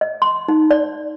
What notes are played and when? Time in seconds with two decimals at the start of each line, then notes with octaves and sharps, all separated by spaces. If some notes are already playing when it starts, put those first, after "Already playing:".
0.01 D#5
0.22 C6
0.48 D#4
0.71 D5